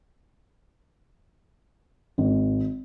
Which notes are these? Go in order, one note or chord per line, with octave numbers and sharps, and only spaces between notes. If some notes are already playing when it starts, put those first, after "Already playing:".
G#1